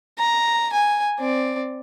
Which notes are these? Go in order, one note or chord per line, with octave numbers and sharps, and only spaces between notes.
A#5
G#5
C4 D5